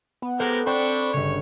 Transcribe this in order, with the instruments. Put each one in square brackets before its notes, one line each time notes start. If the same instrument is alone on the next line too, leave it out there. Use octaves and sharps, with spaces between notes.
[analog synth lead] B3
[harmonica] G#3 G4 A#4 [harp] A4 C5 F#5
[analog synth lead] C4 [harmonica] D4 B5 C#6 [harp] C5 D5 G5
[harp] G1 C#3 [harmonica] C#5